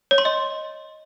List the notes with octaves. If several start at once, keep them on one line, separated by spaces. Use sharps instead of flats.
C#5
C6
D#5